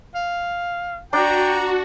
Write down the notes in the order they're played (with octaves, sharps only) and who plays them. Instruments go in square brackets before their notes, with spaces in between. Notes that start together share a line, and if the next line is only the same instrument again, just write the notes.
[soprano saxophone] F5
[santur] D4 [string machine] F#4 [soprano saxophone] G5 [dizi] A#5